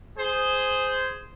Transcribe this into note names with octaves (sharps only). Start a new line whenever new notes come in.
G#4 C5